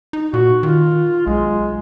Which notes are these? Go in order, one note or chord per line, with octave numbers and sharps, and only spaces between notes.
D#4
A#2 F#4
D#3 F4
B1 G#3